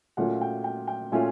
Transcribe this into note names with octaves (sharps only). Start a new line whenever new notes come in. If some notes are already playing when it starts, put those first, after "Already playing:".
A#2 F#3 A3 C#4 F4 F#5
G5
G5
G5
A#2 F#3 A3 C#4 F4 G#5